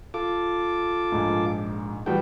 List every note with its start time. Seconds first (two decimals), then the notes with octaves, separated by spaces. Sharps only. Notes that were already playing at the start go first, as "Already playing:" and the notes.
0.14 F4 A4 D6
1.12 A#1 G#2
2.06 E3 F3 G3 F#4 G5